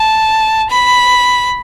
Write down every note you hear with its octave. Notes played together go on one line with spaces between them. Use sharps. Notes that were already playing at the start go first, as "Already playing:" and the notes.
Already playing: A5
B5